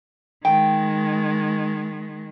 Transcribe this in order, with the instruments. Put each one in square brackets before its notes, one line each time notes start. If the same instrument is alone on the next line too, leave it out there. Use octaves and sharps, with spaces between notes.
[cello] D#3 G#3 [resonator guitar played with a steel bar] G5